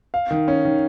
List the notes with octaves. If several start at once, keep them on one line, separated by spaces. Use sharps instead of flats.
F5
D#3
C#4
D#3